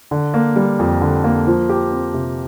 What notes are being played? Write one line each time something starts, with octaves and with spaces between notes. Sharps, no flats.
D3
A#3
G3
F2
D3
A#3
F3
G4
C4
C3